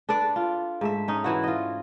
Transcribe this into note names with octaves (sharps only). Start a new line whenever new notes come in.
D4 A4 B4 D5
F4
G#2 A3 E5
C#4 D#4
E3 E4 F#4
F4 D#5